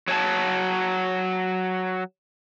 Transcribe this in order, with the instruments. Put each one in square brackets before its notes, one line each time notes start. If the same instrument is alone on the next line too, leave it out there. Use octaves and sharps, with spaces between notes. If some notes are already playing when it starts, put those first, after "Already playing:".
[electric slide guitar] F#3 C#5 G#5 A5